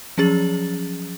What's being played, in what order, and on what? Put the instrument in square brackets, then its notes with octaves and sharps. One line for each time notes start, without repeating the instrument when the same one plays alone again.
[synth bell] F3 F#3 C#4 G#4 A6 F#7